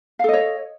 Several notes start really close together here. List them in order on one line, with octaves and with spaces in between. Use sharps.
F5 A4 D#5 C#5